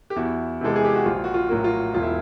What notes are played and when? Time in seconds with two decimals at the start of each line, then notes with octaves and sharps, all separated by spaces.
0.10 G4
0.16 E2 E4 F#4
0.61 C3 E3 G#3 A4
0.76 G#4
0.85 G4
0.95 F#4
1.06 A#1 F4
1.24 F#4
1.34 F4
1.49 A2 F#3 A#3
1.64 F4
1.94 E1 F4
2.03 E4